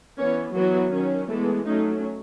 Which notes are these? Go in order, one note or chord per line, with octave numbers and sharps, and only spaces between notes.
E3 B3 C#4 C#5
E3 F#3 B3 F#4
D#3 F#3 C#4
E3 G#3 A3 B3 A4
F#3 A3 C#4 D#4